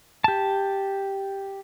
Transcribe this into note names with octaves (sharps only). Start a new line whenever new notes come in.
G4 A5